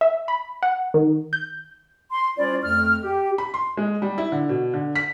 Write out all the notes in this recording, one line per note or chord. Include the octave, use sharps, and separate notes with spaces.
E5
B5
F#5
D#3
G6
C6
G3 C#4 E4 F4 C5 D5
F2 A3 F6
G4
B5
C6
G#3
G3
E4
D3
B2
D3
B6